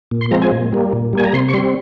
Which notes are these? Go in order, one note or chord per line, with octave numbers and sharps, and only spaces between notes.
A#2
C6
F3 G#3 C4 A#5
G#5
A#2
G3 A#3
A#2
G3 A#3 G#5
A#5
C3 C6
C#6
G3 C4 C6